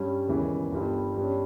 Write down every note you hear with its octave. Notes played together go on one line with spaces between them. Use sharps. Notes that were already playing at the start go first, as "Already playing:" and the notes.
Already playing: G2 G3 C#4
E1 D#2 C#3 E3
G1 G2 G3
G2 G3 C#4